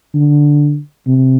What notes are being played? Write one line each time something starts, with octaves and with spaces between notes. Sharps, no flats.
D3
C3